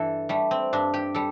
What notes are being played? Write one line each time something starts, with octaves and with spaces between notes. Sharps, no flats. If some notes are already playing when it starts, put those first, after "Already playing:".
Already playing: G2 E3 A4
G3 A3
C4
G2 D4
G4
G3 A4